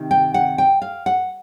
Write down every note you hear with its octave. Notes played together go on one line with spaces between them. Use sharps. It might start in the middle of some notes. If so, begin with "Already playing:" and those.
Already playing: C3 D#3
G5
F#5
G5
F5
F#5